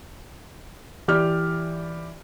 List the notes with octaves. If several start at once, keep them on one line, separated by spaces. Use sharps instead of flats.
E3 G4 D5 F6